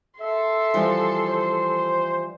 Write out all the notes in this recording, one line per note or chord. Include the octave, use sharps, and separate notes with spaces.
A4 E5 C6
E3 F3 G3
C5